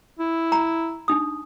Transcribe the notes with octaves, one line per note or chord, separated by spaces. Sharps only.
E4
A#5
D4 D#4 D#6